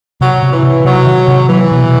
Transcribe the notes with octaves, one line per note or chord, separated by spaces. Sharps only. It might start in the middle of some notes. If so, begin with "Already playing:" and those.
C3 F#3
C3
E3
C3
C3 F#3
D#3
C3
E3 F#3
B2